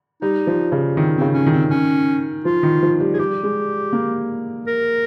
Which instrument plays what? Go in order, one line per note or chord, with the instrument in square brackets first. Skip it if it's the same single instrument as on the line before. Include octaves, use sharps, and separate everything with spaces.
[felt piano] G3 [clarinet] D#4
[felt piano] F3
C#3
[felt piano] D#3 [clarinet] C4
[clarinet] C4
[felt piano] C#3
[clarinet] C#4
[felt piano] D#3
[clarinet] C4
C#4
[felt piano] F3 [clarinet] F4
[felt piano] D#3
F3
G3
[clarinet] G#4
[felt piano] G3 [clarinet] G4
[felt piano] G#3
A#3
[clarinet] A#4